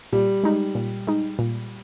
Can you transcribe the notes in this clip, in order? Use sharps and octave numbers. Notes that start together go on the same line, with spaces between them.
A#2 G3
G#3 D#4
A#2
G#3 D#4
A#2